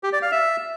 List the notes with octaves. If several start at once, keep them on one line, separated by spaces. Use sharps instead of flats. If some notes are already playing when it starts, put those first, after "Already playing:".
G4
D5
F5
E5